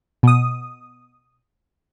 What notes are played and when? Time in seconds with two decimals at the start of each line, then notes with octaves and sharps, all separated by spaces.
0.23 B2 D#6